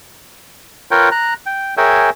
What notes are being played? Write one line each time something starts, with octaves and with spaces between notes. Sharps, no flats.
F4 A#4 B4 C#5 G5
A#5 F#6
G5
G#4 A#4 C#5 E5 G5 G#5